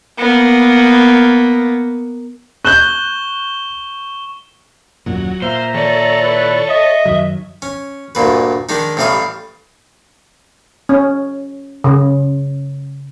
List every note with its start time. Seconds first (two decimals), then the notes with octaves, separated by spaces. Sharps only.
0.19 A#3 B3
2.65 C#6 F#6 G6 E7 G7
5.06 D#1 F#2 A#2 F#3
5.42 A#2 C5 E5 F5 A#5
5.74 D#3 A4 C#5 D5
6.22 E4 B4
6.69 D#5 E5
7.05 F#2 D#3 F#3
7.62 C#4
8.15 D2 G2 A#2 B4
8.69 D#3 G#3 D4 D#4
8.97 A1 A2 E3 G3 F5 D#6
10.89 C#4
11.84 C#3